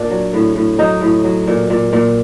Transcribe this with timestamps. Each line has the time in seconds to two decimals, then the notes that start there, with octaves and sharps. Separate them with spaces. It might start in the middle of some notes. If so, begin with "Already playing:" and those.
Already playing: A#2 A#3 D4
0.10 F#3
0.33 A2
0.55 A2
0.78 F#3 D#4
1.01 A2
1.24 F#3
1.47 A#2
1.70 A#2
1.93 A#2